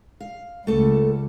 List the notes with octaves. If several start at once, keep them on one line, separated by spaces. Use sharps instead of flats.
F5
C#2 A3 A4